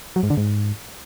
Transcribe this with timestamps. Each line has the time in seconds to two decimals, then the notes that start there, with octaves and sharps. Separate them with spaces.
0.16 F#3
0.23 G#2
0.30 D3
0.37 G#2